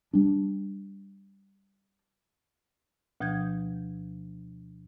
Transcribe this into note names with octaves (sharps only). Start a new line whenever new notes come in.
G3 D4
D2 B2 F3 G6 G#6